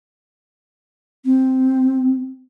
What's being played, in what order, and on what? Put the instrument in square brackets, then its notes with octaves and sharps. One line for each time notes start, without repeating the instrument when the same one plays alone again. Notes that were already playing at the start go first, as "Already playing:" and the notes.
[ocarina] C4